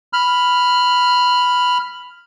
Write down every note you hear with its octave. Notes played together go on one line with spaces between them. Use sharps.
B5 F6